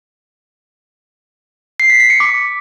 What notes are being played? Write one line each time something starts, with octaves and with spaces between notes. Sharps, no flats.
C7
B6
B6
C#7
D6